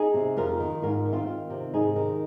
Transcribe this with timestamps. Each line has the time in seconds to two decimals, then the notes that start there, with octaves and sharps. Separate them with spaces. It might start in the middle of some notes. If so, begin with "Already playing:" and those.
Already playing: D#4 G#4
0.14 C3
0.37 F2 F4 A#4
0.60 D#3
0.82 G#2 F4 A#4
1.05 D#3
1.13 C4 F4
1.28 D#3
1.50 C3
1.73 G#2 D#4 G#4
1.96 D#3